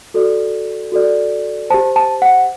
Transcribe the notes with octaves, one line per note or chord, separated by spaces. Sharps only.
F#4 A4 D5
F#4 A4 D5
G4 C5 A5
A5
F#5